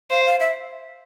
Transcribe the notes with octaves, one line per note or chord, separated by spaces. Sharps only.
C5 F5
F5
E5